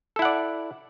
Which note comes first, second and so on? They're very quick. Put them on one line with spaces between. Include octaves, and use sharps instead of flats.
A4 E4 F#5 D5